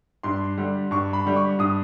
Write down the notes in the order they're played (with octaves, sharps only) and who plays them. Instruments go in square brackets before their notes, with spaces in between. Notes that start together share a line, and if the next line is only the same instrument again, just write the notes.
[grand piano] G2 C6
D3 G3
G2 C#6
B5
D3 G3
C#6
G2 D#6